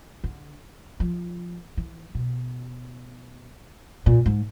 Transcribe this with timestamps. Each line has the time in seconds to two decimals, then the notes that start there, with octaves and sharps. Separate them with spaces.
0.24 D3
1.00 F3
1.77 E3
2.15 B2
4.06 A#2
4.26 G#2